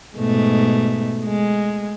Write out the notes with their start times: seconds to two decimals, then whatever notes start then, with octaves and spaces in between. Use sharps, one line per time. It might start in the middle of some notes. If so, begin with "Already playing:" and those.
0.17 G#2 B2 A3
1.25 G#3